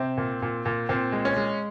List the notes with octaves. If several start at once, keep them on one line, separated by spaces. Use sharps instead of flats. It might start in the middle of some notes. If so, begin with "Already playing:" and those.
Already playing: C3 C4
A#2
A#2
A#2
A#2 C4
G#3
C#4
G#3